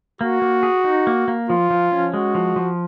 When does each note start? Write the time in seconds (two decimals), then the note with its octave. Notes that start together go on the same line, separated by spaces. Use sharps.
0.21 A#3 F#4
0.42 A#3
0.63 G#4
0.84 D#4
1.07 A#3
1.28 A#3
1.50 F3 F4
1.70 F3
1.92 C#4
2.13 G#3 F#4
2.35 F3
2.56 F3